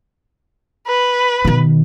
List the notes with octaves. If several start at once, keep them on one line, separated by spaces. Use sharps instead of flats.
B4
B2 D#3